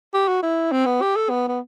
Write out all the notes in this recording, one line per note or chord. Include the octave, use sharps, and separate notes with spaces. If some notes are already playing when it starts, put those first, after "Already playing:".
G4
F#4
E4
C4
B3
G4
A4
B3
B3